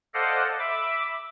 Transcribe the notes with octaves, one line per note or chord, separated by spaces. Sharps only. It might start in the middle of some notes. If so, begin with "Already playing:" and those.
A4 C5 D5 D#5 F5 F#5
E5 B5 D6